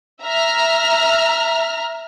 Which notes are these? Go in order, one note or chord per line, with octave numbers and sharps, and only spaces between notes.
E5 A#5 F6